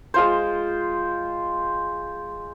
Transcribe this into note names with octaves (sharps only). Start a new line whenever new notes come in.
G#3 F4 C5